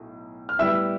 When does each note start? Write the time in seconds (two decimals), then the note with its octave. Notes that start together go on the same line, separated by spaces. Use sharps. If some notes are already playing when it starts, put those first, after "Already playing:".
Already playing: B1 A2
0.49 F6
0.59 A2 G3 B3 E4 G4 E5 E6